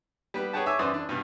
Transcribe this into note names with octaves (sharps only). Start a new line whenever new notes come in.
G3 B3 B4
G#4 B4 C#5 F#5 G5 A5
C#5 E5 G#5 D6 E6
F#2 E3 C5 D5 D#6
D4
G2 B2